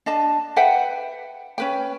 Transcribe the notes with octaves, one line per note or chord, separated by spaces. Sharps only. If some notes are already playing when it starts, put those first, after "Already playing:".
D4 D#5 A5
B4 E5 F#5 G5
C#4 B4 G5